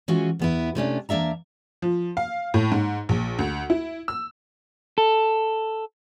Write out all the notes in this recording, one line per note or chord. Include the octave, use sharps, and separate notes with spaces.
E3 G#3 C#4 F4 F#4 G#4
E2 B3 E4
C3 A3 C#4 D4
E2 A#3 D4 E5 A#5
F3
F5
A2
G#2
A#1
D2
E4
E6
A4